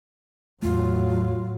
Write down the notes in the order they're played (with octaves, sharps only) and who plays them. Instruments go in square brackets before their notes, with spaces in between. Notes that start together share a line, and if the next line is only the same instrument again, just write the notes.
[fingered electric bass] E2 A3 [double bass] A2 F#3 [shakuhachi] F4